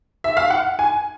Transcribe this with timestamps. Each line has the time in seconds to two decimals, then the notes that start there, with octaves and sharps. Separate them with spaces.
0.24 E5
0.37 F5
0.50 F#5
0.79 G#5